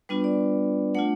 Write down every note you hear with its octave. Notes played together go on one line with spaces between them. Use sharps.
G3 B3 D4 F4 B4
D5
A3 D4 F4 F#5